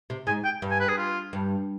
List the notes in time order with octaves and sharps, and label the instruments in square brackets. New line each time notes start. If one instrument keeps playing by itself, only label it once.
[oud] C3
[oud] G#2 [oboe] G#5
[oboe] G5
[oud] G2
[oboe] G#5
B4
G#4
F4
[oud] G2